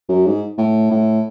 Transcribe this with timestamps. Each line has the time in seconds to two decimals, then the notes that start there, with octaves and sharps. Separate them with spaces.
0.09 F#2
0.26 G#2
0.58 A2
0.91 A2